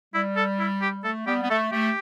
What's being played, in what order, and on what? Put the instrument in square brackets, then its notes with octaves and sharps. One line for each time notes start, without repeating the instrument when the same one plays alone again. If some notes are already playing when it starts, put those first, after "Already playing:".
[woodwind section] G3 [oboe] E4
[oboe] A4
E4
G4
[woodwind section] A3 [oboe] A4
[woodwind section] G3 B3 [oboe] G4
[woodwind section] B3
[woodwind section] A3 [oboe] A4
[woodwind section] A3 [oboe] G4